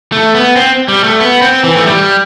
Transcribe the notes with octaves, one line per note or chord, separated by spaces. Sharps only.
A3
B3
C4
G3
A3
B3
C4
E3
A3
G3